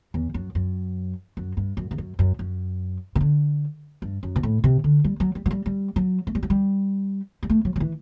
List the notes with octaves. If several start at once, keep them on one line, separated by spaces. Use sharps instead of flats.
E2
F#2
F#2
F#2
G2
F#2
E2
F#2
F#2
F#2
C3
D3
G2
F#2
B2
A2
C3
D3
G3
F#3
G3
F#3
G3
G3
F#3
A3
G3
F#3
G3
G3
A3
F#3
F#3
E3